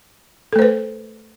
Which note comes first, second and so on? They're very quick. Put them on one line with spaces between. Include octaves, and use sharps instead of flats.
A4 A3 C5 B4